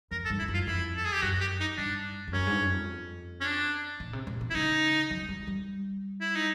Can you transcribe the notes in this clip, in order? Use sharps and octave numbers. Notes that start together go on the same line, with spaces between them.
F2 A#4
A4
G2
E4
F#2
F4
F2 E4
A4
G#4
G4
F#2 F#4
G4
D#4
G2 D4
F2
F#2 C#4
G#2
G2
F#2
F2
C#4
D4
A#2
C3
A#2
B2
E4
C#3 D#4
F#3
G3
G3
E4
D#4